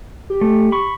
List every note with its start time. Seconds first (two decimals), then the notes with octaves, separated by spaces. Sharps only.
0.30 G4
0.41 A3
0.72 B5 C#6